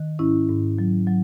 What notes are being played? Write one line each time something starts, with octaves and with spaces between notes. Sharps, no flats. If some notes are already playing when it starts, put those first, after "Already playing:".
Already playing: D#3
G#2 C#4 E4
G#2
F#3
F#3